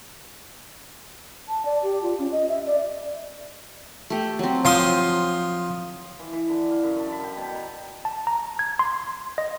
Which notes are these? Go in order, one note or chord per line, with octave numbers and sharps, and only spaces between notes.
A5
D5
G4
F4
C#4
D#5
E5
D5
A3 G4
F#3 C4
F3 C6 D#6
E3
E3
D3
F5
F#2
A5
B5
G5
B2
A#5
A5
A#5
G#6
C6
D#5